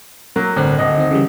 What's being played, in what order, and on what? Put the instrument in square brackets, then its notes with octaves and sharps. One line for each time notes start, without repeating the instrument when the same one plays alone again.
[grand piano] F#3 A#3
[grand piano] G1 [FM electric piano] A2 C4 F#6
[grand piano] D1 D#5
[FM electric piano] D#3 C4
C#3 E3 G3